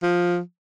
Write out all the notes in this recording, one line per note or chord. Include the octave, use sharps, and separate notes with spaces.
F3